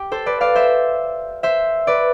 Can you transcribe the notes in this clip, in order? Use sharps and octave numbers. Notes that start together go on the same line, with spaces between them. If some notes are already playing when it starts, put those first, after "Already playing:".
Already playing: G4
A4 C5
B4 D5
D5 F5
C5 E5
C5 E5
B4 D5